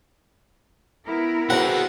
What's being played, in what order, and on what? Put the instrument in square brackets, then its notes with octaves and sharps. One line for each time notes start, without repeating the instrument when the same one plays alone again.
[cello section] B3 E4 A#4
[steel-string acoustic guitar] C4 F#4 G5 [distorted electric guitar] G#4 B4 [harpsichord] F#5